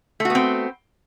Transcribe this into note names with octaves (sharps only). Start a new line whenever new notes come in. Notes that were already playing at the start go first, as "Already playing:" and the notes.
A3 B3 C4 F#4